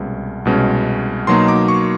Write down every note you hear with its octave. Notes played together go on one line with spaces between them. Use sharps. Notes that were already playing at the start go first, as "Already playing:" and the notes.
Already playing: C2 B2 G#3 C#4
C2 B2 G#3 C#4
B2 F#3 A#3 D#4 C6
D6
C#6